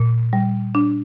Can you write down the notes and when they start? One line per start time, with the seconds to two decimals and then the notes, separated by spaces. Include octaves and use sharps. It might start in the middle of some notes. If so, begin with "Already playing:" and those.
Already playing: A#2
0.33 G3
0.75 D4